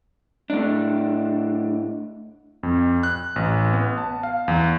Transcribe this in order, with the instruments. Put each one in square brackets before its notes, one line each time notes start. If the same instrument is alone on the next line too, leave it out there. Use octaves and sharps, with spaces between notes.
[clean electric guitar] A2 D4
[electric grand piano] F2
F#6
A1
B3
A5
F5
E2